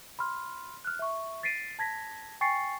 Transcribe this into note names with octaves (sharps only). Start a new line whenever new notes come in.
B5 C6 F6
F6 F#6
E5 C#6
A6 B6 C7 D7 D#7
A5 G#6 A#6 B6
G5 G#5 C#6 A6 C7 C#7